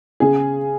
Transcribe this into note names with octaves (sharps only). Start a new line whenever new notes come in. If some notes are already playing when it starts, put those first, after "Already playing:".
C#3 G#4